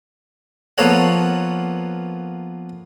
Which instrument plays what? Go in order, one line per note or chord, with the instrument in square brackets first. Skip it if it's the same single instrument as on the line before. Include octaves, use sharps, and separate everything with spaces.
[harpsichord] F3 A#3 B3 A4 C#5 F#5